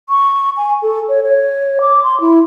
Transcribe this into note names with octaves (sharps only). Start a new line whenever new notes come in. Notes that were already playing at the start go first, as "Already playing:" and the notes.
C#6
G#5
A4
C#5
C#5
D6
C6
E4